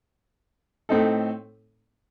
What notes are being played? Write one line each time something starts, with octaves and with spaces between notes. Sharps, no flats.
A2 A3 C4 D#4 A4